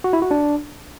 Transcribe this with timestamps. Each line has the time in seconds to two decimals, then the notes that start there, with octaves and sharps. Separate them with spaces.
0.04 F#4
0.13 E4
0.22 F#4
0.31 D4